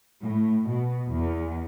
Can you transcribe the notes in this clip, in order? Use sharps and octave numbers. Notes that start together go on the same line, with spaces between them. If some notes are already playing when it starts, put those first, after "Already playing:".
A2
B2
E2